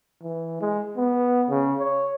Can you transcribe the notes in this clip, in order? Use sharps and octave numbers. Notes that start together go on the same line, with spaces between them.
E3
G#3
B3
C#3
C#5